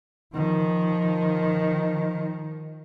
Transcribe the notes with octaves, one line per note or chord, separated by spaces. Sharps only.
D#3 F3